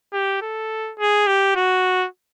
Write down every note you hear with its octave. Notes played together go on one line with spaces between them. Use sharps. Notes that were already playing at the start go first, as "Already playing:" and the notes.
G4
A4
G#4
G4
F#4